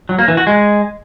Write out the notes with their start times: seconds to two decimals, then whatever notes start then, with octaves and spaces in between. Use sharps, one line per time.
0.09 F#3
0.19 A#3
0.28 E3
0.37 F#4
0.47 G#3